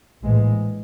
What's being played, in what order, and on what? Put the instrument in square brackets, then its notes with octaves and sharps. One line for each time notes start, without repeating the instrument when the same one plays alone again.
[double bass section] A#1 A2 E3 G#3